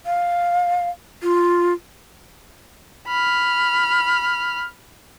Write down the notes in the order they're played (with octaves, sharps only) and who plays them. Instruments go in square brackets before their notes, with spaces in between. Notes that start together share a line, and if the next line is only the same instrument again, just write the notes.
[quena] F5
F4
[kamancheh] B5 F6